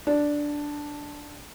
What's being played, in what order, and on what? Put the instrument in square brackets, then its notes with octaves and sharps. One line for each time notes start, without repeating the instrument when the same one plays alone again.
[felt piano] D4